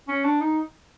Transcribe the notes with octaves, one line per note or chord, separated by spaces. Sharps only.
C#4
D4
D#4